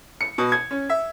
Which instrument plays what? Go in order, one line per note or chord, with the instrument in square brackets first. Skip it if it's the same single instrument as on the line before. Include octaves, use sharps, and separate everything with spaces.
[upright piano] C#7
B2
G#6
C#4
E5